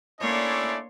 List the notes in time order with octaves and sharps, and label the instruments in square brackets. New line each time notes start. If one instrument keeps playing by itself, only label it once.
[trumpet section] A3 C#4 E4 [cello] A#3 D4 [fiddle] C#5 C6 [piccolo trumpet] D5